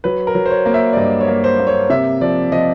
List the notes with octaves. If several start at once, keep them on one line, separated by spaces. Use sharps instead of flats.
F#3 B4
A#4
F#3
C5
C#5
A#3
E5
D5
G2 D#5
C#5
A#3
C5
A#3
C#5
C3 E5
F3 D5
F3 D#5